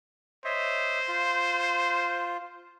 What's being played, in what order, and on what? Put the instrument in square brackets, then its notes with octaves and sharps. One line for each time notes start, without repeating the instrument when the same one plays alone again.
[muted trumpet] C5 [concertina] C#5 D#5 E5
[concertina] F4